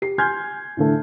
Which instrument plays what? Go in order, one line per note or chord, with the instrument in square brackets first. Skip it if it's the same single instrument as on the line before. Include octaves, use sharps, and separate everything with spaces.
[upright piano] G4 C7
G#5 C6 F6 G6 G#6
A2 D3 A3